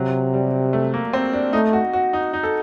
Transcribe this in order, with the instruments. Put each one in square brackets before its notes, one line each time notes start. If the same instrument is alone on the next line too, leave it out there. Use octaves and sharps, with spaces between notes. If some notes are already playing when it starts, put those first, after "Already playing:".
Already playing: [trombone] C3 [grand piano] F#3
[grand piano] G3
A3
A#3
C4
D4
[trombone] A3 [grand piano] D#4
[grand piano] F#4
F#4
D#4
D#4
A4